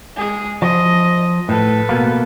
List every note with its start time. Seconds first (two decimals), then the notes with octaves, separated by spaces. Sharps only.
0.17 G#3 G#4
0.62 F3 D#5
1.49 A2 A4 B4
1.89 B2 A#3